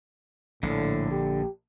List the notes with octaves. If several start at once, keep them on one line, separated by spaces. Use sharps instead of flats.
A#1 A2 D3
G4